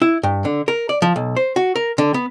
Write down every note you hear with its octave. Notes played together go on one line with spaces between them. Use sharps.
E4
G2
D3
A#4
D5
F3
B1
C5
F#4
A#4
D3
B3